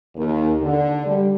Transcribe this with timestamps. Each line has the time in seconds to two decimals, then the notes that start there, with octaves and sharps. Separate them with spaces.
0.16 D#2
0.62 D3
1.06 G3